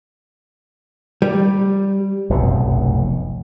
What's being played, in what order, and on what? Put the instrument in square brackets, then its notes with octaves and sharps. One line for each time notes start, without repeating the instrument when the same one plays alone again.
[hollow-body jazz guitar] G3
[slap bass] F1 B1 F#2 A2